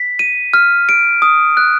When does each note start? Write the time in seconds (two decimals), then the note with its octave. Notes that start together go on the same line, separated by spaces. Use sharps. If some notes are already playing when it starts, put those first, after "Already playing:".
Already playing: B6
0.19 D#7
0.54 F6
0.89 D7
1.22 D#6
1.57 F#6